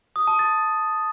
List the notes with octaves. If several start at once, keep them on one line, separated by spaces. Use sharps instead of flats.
D#6
A5
A6